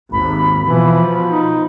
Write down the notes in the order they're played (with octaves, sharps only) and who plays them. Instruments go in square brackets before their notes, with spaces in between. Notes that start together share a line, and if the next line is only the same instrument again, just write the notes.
[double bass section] G#1 D#2 [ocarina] B5
[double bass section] B2 F3 [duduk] E3 [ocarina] B5
[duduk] D#4